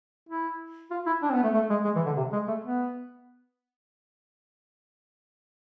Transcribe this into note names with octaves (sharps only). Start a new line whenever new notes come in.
E4
F4
E4
D4
C4
B3
A3
A3
G#3
G#3
E3
D3
C3
G#3
A3
B3